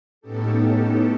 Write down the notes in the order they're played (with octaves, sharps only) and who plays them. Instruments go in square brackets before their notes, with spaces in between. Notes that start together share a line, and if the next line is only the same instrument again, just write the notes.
[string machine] A2 B3 C#4 D#4 G4 A4